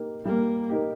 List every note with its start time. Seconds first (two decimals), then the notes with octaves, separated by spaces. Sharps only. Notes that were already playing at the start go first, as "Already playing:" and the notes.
Already playing: A#3 D#4 G4
0.25 G3 A#3
0.70 A#3 D#4 G4